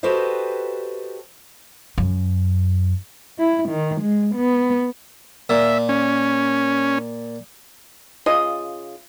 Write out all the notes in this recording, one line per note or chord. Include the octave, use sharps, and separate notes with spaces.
F#4 G4 A4 B4 C5 D#5
F#2
E4
D#3
G#3
B3
A#2 E5
C#4
C#3 F4 D#5